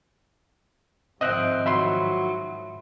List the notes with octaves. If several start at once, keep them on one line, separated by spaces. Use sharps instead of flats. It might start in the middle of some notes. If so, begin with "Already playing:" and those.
G#2 D#3 F3 C4 D#5 E5 F#6
F#3 E5 B5 C6